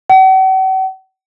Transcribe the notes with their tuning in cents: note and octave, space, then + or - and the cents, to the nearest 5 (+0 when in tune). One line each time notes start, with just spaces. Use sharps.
F#5 +45